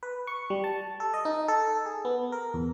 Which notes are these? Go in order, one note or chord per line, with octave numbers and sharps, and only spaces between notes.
B4
C#6
G3
A5
A4
D#5
D#4
A4
G#4
B3
A#4
E2